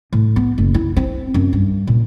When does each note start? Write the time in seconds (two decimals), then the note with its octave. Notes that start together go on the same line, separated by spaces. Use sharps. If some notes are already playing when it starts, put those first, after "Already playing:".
0.13 A2
0.36 B3
0.58 F#1
0.74 E4
0.96 C4
1.34 F#2
1.53 G2
1.87 A#2